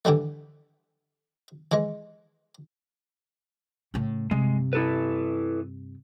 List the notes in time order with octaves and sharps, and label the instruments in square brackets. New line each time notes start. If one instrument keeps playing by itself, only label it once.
[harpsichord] D3 E3 G3 A3
E3 G#3
[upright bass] A2 C#3
[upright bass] G2 C3 [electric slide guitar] G#3
[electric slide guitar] E4 A4 B4